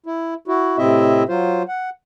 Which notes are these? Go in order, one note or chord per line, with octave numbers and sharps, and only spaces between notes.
E4
E4 F#4
A2 C3 C4 E4 D#5 E5
F#3 F4 C5
F#5